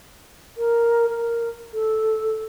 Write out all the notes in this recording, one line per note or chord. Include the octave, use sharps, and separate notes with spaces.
A#4
A#4
A4